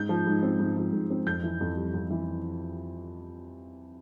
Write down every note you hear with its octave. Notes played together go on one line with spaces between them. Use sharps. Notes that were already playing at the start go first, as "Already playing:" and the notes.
Already playing: G#2 G6
F3
G#2
C4
G#2
F3
G#2
C4
F2 G6
E3
F2
G3
F2
E3